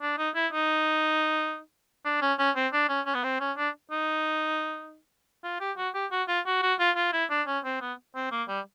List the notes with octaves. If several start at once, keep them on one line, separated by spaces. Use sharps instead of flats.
D4
D#4
E4
D#4
D4
C#4
C#4
C4
D4
C#4
C#4
B3
C4
C#4
D4
D#4
F4
G4
F#4
G4
F#4
F4
F#4
F#4
F4
F4
E4
D4
C#4
C4
B3
C4
A#3
G3